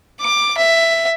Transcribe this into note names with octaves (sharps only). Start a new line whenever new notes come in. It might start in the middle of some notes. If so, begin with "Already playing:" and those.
D6
E5